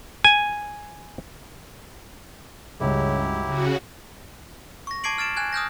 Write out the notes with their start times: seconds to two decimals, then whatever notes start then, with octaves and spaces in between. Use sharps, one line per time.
0.24 G#5
2.80 C#2 G2 C#3 F#3 E4 G4
3.45 C#3 F#4
4.87 C#6 A#6
5.04 A5 D6 G#6 C7 D7 F#7
5.18 F6 A6 D7 E7
5.36 G#5 F#6 G#6
5.53 D#6 F6 G6 A#6